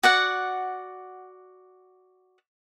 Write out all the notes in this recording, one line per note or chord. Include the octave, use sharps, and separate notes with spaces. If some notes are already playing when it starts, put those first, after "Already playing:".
F#4 D5 F#5